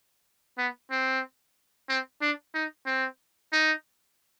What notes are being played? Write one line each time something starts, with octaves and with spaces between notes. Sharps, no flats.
B3
C4
C4
D4
D#4
C4
D#4